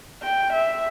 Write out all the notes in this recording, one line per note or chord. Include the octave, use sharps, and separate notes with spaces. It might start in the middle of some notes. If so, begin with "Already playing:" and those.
G5
E5